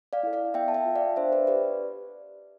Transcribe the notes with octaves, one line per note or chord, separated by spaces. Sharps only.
D5 F5
E4 A4
D5 F5
B3 E5 G5
A5
E5 G5
F4 A4
D5 F5
D4 C5 E5
B4 D5
G4 B4 D5